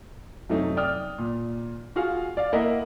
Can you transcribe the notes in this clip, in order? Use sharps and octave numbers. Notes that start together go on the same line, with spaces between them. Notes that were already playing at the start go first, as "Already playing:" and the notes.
F#2 C3 F#3 A3 D#4
D5 G5 D#6 F6
A#2
F4 F#4 G#4 F5
D5 F5
A#3 E4 A#4 D#5 E5 F#5